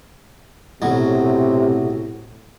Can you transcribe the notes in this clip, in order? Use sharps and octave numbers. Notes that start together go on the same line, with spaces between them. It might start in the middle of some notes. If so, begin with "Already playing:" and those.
B1 A2 C3 F#3